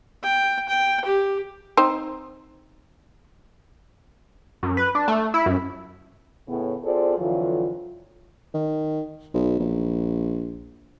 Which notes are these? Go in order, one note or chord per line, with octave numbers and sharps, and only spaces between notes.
G5
G5
G4
C4 D#4 C5
F#2
B4
D4
A3
E4
F#2
A2 C#3 B3
C4 F4 G#4 A4 C5 D5
F2 D3 E3 F#3 F4
D#3
B1
A#1